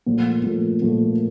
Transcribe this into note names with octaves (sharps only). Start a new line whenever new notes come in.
A#2 F3 A3
A#2 F3 A3
A#2 F3 A3